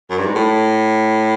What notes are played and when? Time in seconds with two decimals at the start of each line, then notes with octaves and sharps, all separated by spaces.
0.10 F#2
0.18 G2
0.26 G#2
0.35 A2